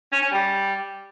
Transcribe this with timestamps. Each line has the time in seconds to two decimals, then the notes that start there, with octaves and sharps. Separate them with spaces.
0.11 C#4
0.21 C#4
0.31 G3